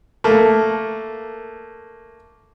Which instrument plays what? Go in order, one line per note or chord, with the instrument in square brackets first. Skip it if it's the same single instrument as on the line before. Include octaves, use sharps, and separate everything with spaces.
[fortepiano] A3 A#3